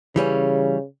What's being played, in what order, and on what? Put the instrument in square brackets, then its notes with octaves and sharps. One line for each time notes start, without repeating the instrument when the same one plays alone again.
[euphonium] C#3 [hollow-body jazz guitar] E3 G3 C#4